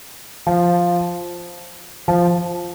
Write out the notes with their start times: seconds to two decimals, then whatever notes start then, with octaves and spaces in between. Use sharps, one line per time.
0.47 F3
2.08 F3